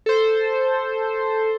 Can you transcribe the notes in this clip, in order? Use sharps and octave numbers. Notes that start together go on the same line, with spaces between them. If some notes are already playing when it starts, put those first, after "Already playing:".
A4 C5